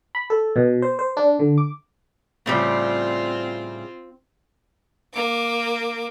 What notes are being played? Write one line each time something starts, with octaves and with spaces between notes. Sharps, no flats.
B5
A4
B2
C5
C5
D4
D3
D6
A2 C#3 G3 C4 F4
A#3 D6